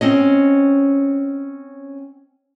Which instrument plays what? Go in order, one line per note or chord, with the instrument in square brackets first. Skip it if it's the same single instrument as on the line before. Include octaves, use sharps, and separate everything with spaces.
[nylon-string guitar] C4 C#4 D#5